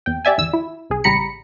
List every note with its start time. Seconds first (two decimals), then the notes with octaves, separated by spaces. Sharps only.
0.06 E2 G5
0.25 G4 D5 E5 G#5
0.38 G#1 E2 E6
0.53 E4
0.90 C2 G#4
1.04 A1 C#3 G3 A#5 B5 C#7